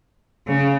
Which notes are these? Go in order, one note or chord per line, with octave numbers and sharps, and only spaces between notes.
C#3